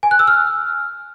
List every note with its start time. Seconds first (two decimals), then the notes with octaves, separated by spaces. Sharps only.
0.03 G#5
0.11 F#6
0.19 E6
0.27 F6